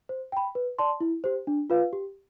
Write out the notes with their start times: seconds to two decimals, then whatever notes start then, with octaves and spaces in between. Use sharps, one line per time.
0.09 C5
0.32 G5 B5
0.55 B4
0.79 D5 A5 C6
1.01 E4
1.24 G4 C5
1.47 D4
1.70 F4 B4 F5
1.93 G4